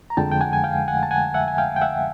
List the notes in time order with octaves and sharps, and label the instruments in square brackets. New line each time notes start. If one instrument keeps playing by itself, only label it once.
[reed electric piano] A#5
F2 D3 F3 G#3 G5 A5
G5
F#5 G#5
G#5
F5 G5
F#5 G#5
A5
F#5 G#5
E5 F#5
G#5
F5 G5
G5
E5 F#5